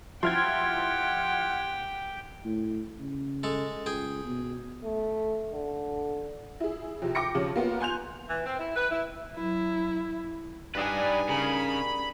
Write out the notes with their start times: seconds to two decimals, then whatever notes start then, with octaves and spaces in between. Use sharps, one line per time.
0.23 F3 E4 G4 F#5 G5 C6 F6 G#6
2.45 A2
2.99 C#3
3.43 G#3 A4
3.86 C#2 G#4 G5
4.25 B2
4.84 A3
5.53 D3
6.60 E4 G#4
7.02 F2 C3
7.15 G5 D6 A#6 C#7
7.35 C#3 F3 G4 C#5
7.56 A#3 B3 F4
7.81 G#5 C6 F#6 G6 F7
8.29 E3
8.45 C4
8.58 E4
8.76 B4
8.91 E4
9.34 F#3 E4
10.75 G2 D4 D#4 B4 D5 G#5
11.29 C#3 G#4 A#4 B5